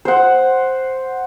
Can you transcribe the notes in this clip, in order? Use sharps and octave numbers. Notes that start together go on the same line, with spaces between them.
C5 F#5